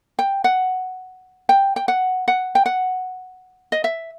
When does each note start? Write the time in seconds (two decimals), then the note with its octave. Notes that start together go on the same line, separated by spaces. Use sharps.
0.19 G5
0.44 F#5
1.49 G5
1.76 G5
1.88 F#5
2.28 F#5
2.55 G5
2.66 F#5
3.72 D#5
3.84 E5